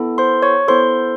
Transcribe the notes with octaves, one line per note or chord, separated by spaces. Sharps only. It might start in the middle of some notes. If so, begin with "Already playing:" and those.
Already playing: B3 E4 A4
C5 C6
C#5 C#6
B3 E4 A4 C5 C6